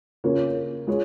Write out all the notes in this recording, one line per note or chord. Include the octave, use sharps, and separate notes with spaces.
C#3 A#3 C#4 F4 C#5
G#3 F4 G#4 C#5